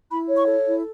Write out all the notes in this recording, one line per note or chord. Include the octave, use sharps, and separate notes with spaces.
E4 B5
C#5
C#6
A4
E4